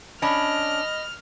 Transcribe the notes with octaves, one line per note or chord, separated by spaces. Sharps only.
C#4 D4 D#5 B5 F6